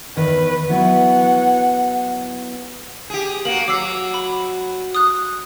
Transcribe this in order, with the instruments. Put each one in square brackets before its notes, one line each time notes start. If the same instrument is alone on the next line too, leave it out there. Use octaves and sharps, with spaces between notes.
[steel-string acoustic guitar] E2 D#3 [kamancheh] B4
[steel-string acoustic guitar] F#3 B3 E4 [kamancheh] F#5
[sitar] G4 G#4
[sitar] A#3 F#4 [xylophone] F#7
[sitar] F#3 [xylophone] D6 E6 C7
[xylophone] B5
D#6 F#6